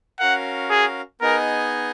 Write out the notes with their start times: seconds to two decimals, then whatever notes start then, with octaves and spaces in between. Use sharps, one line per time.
0.19 C#4 F#4 A#4 F5 F#5
0.70 G#4
1.21 B3 D#4 G#4 A#4 D#5 G#5